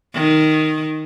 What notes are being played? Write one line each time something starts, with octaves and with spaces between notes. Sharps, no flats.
D#3